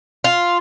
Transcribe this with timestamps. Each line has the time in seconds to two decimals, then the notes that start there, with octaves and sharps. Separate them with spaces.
0.24 F4